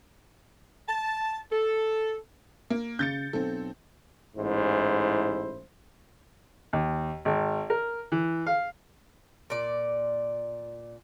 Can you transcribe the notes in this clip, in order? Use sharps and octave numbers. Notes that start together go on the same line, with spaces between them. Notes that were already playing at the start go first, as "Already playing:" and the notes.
A5
A4
A#3
C#3 G6 A6 C#7
B1 C4 A4
A1 G#2 E4 C5
D#2
G#1
A#4
E3
F5
A#2 D5